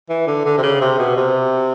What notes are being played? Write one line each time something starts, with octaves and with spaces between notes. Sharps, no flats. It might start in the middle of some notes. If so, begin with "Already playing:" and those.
E3
D3
D3
C3
C#3
C3
B2
C3